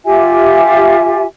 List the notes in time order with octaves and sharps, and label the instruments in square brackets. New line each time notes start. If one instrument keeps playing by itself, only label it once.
[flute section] F4 G4 E5 G#5